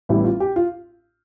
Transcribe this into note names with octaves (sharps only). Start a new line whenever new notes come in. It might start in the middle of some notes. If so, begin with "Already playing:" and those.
A1 A2 G3 B3 E4
F4
G4
F4